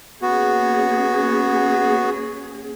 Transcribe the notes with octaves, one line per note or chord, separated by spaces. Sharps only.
A#3 B3 C#4 F#4 G#4